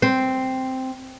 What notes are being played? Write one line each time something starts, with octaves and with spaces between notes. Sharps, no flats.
C4